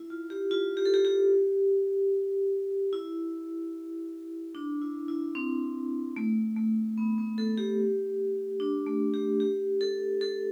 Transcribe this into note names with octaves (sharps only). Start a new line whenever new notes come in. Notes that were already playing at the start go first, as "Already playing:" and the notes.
Already playing: E4
F4
G4
F4
G4
A4
G4
G4
E4
D4
E4
E4
C4
A3
A3
B3
B3
A4
G4
D4
A3
G4
G4
A4
A4